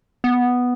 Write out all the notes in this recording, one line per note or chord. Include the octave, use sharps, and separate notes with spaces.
B3